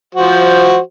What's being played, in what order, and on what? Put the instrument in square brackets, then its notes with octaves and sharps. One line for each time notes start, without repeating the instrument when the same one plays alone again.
[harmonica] F3 F#4 C5